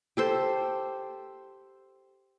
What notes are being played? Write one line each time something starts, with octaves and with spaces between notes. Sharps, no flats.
G4 A4 C5